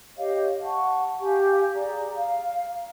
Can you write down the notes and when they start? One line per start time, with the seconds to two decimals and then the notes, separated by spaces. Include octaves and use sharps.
0.17 G4 C#5 D#5 F5
0.63 F#5 A5 C#6
1.20 G4 F5 G#5
1.75 G#4 D5 A#5
2.15 F5